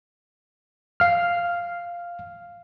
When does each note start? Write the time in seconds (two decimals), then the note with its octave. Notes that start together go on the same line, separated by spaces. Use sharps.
1.00 F5 F6